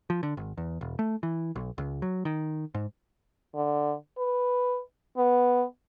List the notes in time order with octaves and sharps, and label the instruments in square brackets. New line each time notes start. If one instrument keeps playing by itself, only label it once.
[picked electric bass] F3
D3
G#1
E2
E1
A3
E3
B1
C#2
F#3
D#3
G#2
[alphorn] D3
B4
B3